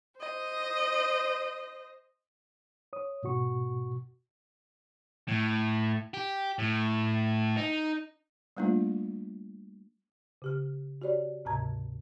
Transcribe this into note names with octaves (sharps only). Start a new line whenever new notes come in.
C5 D#5
C#5 D#6
G#2 B2 F#4 C#6
A2
G4
A2
D#4
G3 A3 A#3 D4 F4
C#3 G4 F6
F#4 G4 C#5 D5
D2 G#2 C3 A5 A#5 G#6